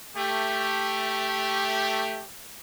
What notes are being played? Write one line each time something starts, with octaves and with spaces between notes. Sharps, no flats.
A3 G4